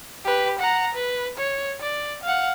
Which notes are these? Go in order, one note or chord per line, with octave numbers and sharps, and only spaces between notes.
G4 B4
F#5 A#5
B4
C#5
D5
F5 F#5